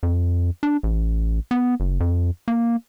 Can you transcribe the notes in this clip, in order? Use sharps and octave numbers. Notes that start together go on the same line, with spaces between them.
F2
D4
A1
B3
F#1
F2
A#3